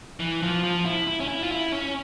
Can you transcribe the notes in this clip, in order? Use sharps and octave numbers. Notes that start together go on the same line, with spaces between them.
E3
F3
F3
E4
E4
C#4
E4
F4
E4
C#4